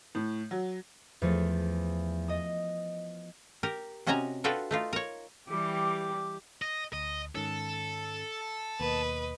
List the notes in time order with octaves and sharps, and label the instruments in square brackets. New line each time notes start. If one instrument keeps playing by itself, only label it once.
[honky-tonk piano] A2
F#3
[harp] E2 F3 A3
D#5 D#6
[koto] G4 A#4
C3 C#4 F#4 D#5 G#5 A#5
D4 F4 F#4 A4 B4 G5
A3 D#4 F4
A#4 C#5
[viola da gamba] E3 G3 [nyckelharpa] G4 D6
[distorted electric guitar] D#5
[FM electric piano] D2 [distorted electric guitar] D#5
[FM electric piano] G#2 D#3 C#4 [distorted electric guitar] A4
[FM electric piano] D#2 B2 A#3 [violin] B4 D#5